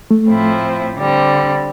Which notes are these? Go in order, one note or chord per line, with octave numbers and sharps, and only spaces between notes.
A3
A2 F3 C4 E4
D3 G3 C4